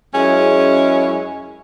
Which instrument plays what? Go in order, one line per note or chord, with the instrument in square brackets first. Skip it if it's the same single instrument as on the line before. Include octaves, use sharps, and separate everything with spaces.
[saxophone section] F#2 G#3 C#4 E4 G#4